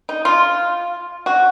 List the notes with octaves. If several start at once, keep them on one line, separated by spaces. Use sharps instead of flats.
D#4
F4
F#4